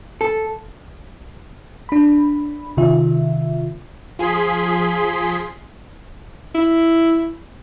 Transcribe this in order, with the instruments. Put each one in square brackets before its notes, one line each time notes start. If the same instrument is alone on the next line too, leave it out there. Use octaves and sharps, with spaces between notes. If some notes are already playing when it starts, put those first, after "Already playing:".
[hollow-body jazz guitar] A4
[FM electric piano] D4 B5
C3 D#3 F4 E5
[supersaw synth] F3 G#4 C6 B6
[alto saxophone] E4